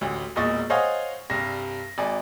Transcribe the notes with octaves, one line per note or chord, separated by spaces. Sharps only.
A1 D2
E1 E2 A#2 D#5 C#6 A6
C5 C#5 D#5 F5 F#5 G#5
C2 G2 A#6
G#1 D5 G#5